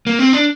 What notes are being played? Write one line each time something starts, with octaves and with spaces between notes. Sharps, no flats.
A#3
C4
D4